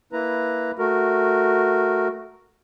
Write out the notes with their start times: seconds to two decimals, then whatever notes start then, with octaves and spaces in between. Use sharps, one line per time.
0.13 A#3 E4 B4 A#5
0.78 A3 F#4 A#4